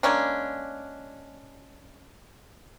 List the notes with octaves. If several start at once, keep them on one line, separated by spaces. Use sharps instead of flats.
G#3 A#3 C#4 D4